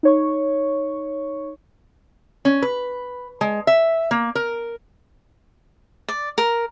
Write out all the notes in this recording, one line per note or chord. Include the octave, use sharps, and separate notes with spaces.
D#4 C#5 C#6
C#4
B4
G#3
E5
A#3
A#4
D5
A#4